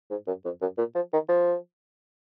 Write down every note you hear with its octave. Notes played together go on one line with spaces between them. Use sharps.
G#2
F#2
F2
F#2
A#2
F3
D#3
F3